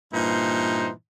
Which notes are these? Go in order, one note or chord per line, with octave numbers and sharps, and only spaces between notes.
G2 A#2 E3 D#4 C5